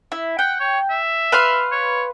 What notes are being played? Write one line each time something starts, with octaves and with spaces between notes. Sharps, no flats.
E4
F#5 G5
C#5
E5
B4 F5 C6
C#5